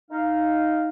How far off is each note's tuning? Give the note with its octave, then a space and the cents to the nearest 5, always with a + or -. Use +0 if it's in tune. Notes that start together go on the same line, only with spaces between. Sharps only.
D#4 +0 F5 +0